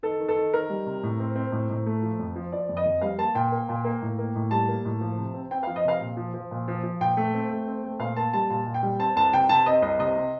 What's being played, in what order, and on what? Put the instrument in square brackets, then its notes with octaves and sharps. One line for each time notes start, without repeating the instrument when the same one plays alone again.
[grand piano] D#3 A4
D#3
A4
D#3
D#3 A#4
G3
C3
A2
C4
C4
A2
A2
A3
F3
F2
F3
F3 D5
F2
D#5
F2
G3 F5
A#3 A5
A#2 G5
A#3
A#2
A#3
A2
A#3
A2
G3 A5
A#3
A2
F3
C3
C4
C4 G5
F3 F5
D#5
C3 F5
A#2
F3
F3
A#2
F3
F3
A#2 G5
A3
C4
A3
C4
A3
A#2 F5
A#3 A5
G3 A5
A#2 A5
A#2
G5
G3
C4 A5
C2 A5
C3 G5
C3 A5
C4 D#5
C2 D#5
C3 D#5
C3